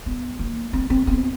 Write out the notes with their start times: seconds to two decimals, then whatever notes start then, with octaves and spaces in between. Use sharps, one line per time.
0.06 B3
0.39 A#3
0.73 C4
0.90 C4
1.07 B3